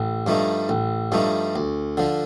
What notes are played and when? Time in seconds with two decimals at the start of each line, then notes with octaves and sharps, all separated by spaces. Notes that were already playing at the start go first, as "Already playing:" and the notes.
Already playing: A1
0.27 G2 F3 A3 D#4
0.69 A1
1.12 G2 F3 A3 D#4
1.56 D2
1.97 D3 F3